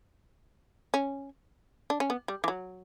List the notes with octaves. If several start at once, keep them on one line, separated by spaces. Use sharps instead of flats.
C#4
D4
C#4
B3
G3
E3
F#3